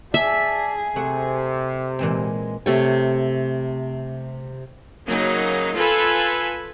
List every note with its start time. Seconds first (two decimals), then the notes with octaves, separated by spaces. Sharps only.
0.14 G#4 D5 E5 A5
0.96 C3 A3 F#5
1.99 A#2 E3 G#3 C4
2.66 C3 A3 C#5
5.08 C#3 F#3 A#3 D#4
5.76 F4 A4 B4 G#5 B5 E6